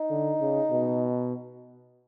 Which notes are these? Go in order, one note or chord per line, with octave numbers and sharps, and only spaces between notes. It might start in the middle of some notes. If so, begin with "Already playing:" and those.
Already playing: D#4
D3
C#3
B2